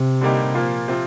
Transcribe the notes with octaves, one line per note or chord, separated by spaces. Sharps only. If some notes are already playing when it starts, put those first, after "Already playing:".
Already playing: C3
D3 G3 A#3 D#4 G4
A#2 F3 A#3 F4
C3 F3 C4 F4